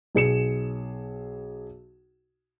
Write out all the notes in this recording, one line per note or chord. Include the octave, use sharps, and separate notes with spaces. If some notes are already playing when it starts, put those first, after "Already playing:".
B1 G#4 C#7 E7